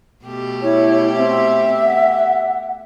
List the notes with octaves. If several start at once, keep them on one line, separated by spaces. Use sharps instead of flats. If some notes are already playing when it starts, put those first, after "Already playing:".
B2 A3 G4
E4 C#5
C4 E5
F#5